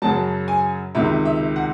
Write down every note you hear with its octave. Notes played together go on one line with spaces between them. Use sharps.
F#2 C#3 F#3 A5
G#5
C#2 C3 D#3 E5
E5
F#5